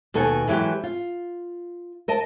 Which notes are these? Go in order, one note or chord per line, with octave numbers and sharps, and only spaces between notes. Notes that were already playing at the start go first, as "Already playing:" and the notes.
D#2 B2 A4 F#5 G#5
E3 F#3 G#3 G4
F4
A#4 D#5 A5